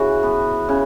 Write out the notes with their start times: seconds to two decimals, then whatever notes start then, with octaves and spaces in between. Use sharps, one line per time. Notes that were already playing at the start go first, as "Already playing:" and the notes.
Already playing: C#3 E3 F#4
0.23 B3
0.69 C#3